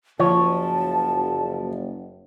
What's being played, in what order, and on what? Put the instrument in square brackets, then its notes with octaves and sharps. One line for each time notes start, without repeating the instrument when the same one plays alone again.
[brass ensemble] F#1 [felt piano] F3 [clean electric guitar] C#5 [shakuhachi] A5